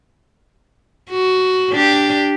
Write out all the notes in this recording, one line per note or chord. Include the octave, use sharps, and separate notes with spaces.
F#4
D4 G4